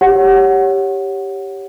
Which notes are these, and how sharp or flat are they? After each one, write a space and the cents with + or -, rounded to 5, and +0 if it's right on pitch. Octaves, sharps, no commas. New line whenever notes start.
G4 +0 C#5 +0 F#5 +0